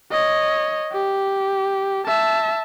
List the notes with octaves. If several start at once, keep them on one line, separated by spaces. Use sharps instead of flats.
C#5 D#5
G4
E5 A5